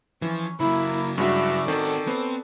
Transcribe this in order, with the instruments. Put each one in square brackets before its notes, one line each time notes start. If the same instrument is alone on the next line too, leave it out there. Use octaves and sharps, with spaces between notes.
[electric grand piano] E3 [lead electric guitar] F3 [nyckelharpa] C#4
[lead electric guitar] C#3 F#3 [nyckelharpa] A#3 [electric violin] E4 [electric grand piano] B5
[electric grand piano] G2 G#3 F#4 [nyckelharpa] C#4 D5 [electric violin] E5
[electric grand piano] D#3 [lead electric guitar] C4 F#4 [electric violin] A4
[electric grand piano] B3 [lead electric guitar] C4